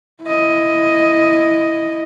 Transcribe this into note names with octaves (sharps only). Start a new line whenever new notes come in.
E4 D#5